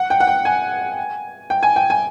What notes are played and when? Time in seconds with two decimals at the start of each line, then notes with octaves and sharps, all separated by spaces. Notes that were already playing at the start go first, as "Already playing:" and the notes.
Already playing: F#5
0.10 G5
0.20 F#5
0.27 G5
0.45 G#5
1.50 G5
1.63 G#5
1.76 G5
1.90 G#5